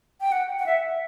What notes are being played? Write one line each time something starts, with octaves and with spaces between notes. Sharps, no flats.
G5
F#5
F#5
E5